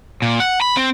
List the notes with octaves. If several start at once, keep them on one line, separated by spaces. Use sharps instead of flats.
A#2
F#5
B5
C4